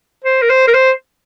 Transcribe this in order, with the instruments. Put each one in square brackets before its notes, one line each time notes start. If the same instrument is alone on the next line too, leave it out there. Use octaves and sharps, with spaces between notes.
[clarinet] C5
A#4
C5
A#4
C5